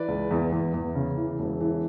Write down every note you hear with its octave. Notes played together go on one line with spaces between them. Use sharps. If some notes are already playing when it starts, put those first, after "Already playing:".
Already playing: E3 B4 D5
C#2
E2
E2
E2
C#3
E3
E1
E3